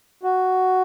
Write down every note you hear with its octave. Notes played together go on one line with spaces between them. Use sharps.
F#4